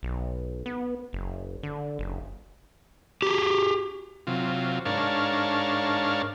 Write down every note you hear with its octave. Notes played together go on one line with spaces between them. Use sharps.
B1
B3
F#1
D3
F#1
G4 G#4
C3 F#3 F4
G#2 D4 A#4 C#5 F5 A5